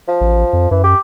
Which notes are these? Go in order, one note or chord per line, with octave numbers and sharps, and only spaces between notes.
F3
A1
F2
F#2 E3
G4